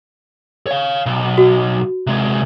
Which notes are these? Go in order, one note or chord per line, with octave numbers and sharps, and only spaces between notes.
C#5 F5
B1
F#4
C3 G#3